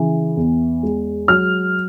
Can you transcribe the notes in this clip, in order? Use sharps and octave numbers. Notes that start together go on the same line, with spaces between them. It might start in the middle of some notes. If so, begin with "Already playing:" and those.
Already playing: C#3 E3
E2
G#3
F#3 F6